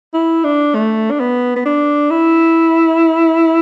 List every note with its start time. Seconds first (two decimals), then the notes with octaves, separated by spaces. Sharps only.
0.13 E4
0.44 D4
0.75 A3
1.11 D4
1.20 B3
1.56 B3
1.65 D4
2.10 E4